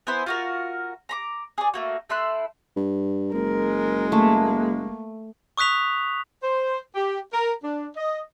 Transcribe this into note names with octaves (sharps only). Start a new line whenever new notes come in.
B3 E4 C5 G#5
F4 F#4 A#4
A#5 B5 D6
G#4 D5
A3 A#3 F#4
A3 E4 C6 F#6
G2
F#1 G#3 A#4
A3 A#3
C#6 D#6 F#6 B6 F7
C5
G4
A#4
D4
D#5